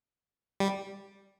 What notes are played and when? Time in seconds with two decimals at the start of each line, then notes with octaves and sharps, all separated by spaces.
0.60 G3